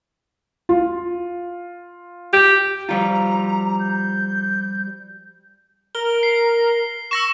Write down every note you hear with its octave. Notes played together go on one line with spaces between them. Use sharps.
F4
G4
F3 G3 F4 A#5
G6
A#4 G7
C7
C#6 E6 A#6 E7